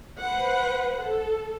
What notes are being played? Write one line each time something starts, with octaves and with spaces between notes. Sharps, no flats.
B4 C5 F#5
A4